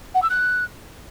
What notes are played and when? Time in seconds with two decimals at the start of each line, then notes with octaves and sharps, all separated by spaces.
0.14 F#5
0.22 E6
0.30 F#6